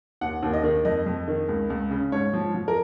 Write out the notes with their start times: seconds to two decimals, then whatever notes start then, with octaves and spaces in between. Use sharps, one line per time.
0.21 D#2 F#5
0.43 D#2
0.53 D#5
0.64 D#3
0.85 F2 D#5
1.06 F2
1.28 D#3
1.49 C#2
1.70 C#2
1.91 C#3
2.12 G#2 C#5
2.34 F3
2.55 F3
2.68 A#4